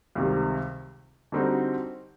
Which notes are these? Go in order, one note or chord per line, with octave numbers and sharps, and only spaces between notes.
C#2 C3 D#3 G3 C4
D3 G3 C4 D#4 F#4